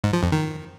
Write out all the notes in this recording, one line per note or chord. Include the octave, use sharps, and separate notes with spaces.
G#2
F3
F2
D#3